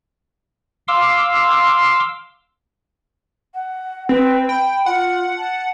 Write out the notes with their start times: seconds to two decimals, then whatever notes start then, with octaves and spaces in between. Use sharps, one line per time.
0.88 F5 C6 D6 E6
3.54 F#5
4.09 C4 B4
4.49 G5 B5
4.86 F4 F#5
5.37 A5